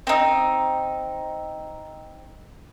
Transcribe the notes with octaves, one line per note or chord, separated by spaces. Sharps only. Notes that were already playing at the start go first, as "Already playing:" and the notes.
C4 D#4